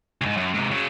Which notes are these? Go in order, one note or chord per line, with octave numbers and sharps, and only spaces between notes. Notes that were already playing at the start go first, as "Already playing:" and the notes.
D2 G#2
F#2
G#2 C3
C#3 F#3